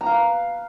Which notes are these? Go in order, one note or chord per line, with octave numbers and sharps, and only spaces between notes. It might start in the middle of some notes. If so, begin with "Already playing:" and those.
A#5
F5
B4